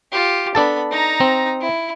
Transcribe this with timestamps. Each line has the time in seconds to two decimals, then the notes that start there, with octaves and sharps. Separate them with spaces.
0.12 F4 G4
0.55 B3 D4 A4 A5 B5
0.91 D#4 A#5
1.20 C4
1.61 E4